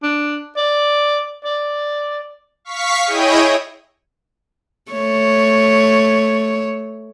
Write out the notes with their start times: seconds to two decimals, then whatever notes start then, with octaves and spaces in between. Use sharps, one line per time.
0.03 D4
0.57 D5
1.45 D5
2.65 F5 C#6 B6
3.04 E4 G#4 C#5 D#5 G5 D#6
4.92 A3 C#5